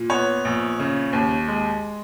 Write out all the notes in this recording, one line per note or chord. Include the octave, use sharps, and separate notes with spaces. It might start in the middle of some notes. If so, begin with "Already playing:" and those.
Already playing: A#2
B3 C#5
A#1
C#3
D#2
G#3